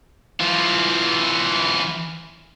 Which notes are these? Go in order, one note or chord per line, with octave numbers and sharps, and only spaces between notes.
E3 F4